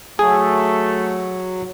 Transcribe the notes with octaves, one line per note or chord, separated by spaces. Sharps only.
F#3 A3 G#4